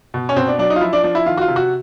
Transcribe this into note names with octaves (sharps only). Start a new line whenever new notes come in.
B2
C#4
B2 C4
D4
F#3 D4
D#4
F4
F3 E4
D4
F3 D4
E4
D#3 F4
F#4
F4
C3
F#4